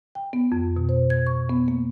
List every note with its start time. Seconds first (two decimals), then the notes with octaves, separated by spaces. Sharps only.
0.15 G5
0.33 B3
0.52 F2
0.77 B2
0.89 C5
1.10 G#6
1.27 C#6
1.49 B3
1.68 A#3